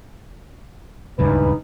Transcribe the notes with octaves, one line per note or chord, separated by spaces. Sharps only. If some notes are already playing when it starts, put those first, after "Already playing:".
D#1 C#2 G2 E3 D#4 B4